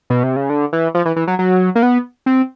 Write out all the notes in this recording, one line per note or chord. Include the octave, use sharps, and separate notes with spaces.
B2
C3
C#3
D3
E3
F3
E3
E3
F#3
F#3
A#3
B3
C4